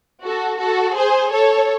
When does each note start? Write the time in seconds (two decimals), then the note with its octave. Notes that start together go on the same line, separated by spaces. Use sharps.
0.24 F#4 A4
0.60 F#4 A4
0.96 G#4 C5
1.32 A4 C#5